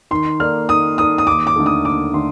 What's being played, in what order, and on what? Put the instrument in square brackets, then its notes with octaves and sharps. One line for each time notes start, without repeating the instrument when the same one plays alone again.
[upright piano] D#3 [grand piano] C6
[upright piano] A#3 D#4 A4 D5 [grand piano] F6
[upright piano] D#3 [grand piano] D#6
[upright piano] A#3 D#4 A4 D5 [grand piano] D#6
[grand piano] D#6
[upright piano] D#2 [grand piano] D6
[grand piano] D6
[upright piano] D3 A3 D#4 A4
[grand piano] D#6
[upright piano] D#2 [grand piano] D6
[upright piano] D3 A3 [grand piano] C6